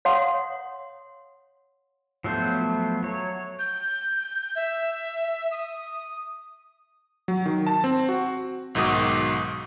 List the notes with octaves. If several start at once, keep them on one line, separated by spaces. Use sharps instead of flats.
C#5 F5 F#5 C6 D#6
F3 F#3 A3 B3 C5
F#3 C#5
G6
E5
D#6
F#3
D#3
A5
C4
F#4
B1 G#2 D#3 F#4 D#6